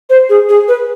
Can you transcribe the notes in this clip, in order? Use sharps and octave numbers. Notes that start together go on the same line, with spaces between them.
C5
G#4
G#4
B4